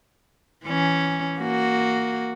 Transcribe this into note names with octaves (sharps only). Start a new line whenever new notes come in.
E3 C#4
A#3 F#4